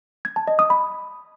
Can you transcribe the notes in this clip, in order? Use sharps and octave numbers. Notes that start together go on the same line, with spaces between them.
G#6
A5
D#5
D#6
B5